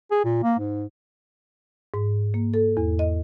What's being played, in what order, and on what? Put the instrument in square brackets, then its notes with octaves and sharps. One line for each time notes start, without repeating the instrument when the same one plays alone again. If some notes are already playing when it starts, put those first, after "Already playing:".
[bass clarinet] G#4
A#2
A#3
G#2
[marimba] G#2
A#3
A4
E2
D#5